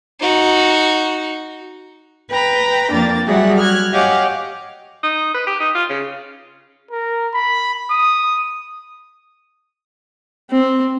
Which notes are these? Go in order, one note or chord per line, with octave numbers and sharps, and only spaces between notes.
D#4 F#4
B4 G5 A#5 B5
F2 A#3 D4 G5 A6
F#3 G3 F#4 G#4 E5 F#5
F6 F#6 G#6
G4 C#5 D#5 F5 F#5 G#5
D#4
B4
G4
D#4
F4
C#3
A#4
B5
D#6
C4